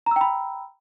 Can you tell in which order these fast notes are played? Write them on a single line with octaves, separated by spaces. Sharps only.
A#5 E6 G5 B5